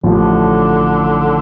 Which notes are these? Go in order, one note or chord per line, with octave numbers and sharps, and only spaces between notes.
A1 A2 D3 F3